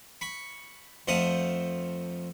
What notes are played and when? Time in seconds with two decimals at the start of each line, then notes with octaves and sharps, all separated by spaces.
0.21 B5 C#6
1.08 F2 F3 A3 F#5 D#6